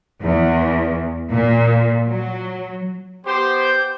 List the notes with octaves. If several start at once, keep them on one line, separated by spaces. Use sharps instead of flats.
E2
A#2
F#3
B3 G4 C5
G6